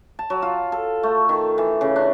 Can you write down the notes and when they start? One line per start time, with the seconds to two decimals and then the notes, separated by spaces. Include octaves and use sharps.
0.19 A5
0.30 F#3
0.42 F4
0.72 A4
1.03 A3
1.29 D#3
1.58 E3
1.81 C#3
1.96 D4